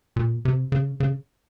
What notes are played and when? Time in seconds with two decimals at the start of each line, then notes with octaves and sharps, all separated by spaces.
0.16 A#2
0.45 C3
0.72 C#3
1.00 C#3